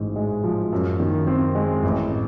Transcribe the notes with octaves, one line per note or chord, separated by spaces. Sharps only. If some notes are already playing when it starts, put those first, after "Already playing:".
Already playing: A1 G#2
G#3
F3
F#2
D#3
C4
G#3
A1